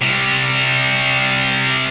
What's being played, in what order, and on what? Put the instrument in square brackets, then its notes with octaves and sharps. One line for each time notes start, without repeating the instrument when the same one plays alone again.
[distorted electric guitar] C3 G3